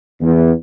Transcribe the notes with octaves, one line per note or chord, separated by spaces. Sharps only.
E2